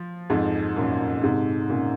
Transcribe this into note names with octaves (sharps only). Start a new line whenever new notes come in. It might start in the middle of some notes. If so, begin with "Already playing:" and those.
Already playing: F3
F2 G#2
F#2 A#2
G#2 C3
A#2 C#3